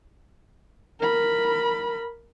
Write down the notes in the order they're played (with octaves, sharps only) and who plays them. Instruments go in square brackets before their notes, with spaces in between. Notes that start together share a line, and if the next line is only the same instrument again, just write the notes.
[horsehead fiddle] A#4 B5